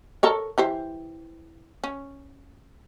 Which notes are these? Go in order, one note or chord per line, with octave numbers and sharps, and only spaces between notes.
A4 A#4 C#5
E3 G4 C5
C#4